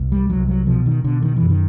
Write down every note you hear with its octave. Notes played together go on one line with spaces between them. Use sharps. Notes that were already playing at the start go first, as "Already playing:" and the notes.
Already playing: C2
G3
C2 F#3
F#3
B2 F3
D#3
B2 D3
D#3
E3
F#2
D#3